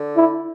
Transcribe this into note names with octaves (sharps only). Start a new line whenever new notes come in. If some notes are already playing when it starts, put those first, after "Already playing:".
Already playing: D3
E4